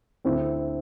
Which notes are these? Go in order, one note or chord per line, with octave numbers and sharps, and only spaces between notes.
D2 D3 C4 E4